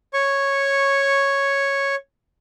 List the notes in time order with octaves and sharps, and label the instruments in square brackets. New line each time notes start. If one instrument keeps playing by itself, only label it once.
[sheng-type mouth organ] C#5 C#6